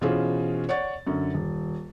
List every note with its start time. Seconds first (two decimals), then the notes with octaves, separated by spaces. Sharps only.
0.01 B2 E3 C#4 F4 G#4 C5
0.69 C#5 D5 F#5 C#6 A6
1.07 F#2 D3
1.34 D#1